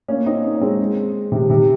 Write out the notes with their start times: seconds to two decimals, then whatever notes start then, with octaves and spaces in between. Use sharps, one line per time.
0.08 A#3 C#4
0.26 C4 D#4
0.57 C#4
0.61 G#3 C4
1.32 C3 D#3
1.50 C3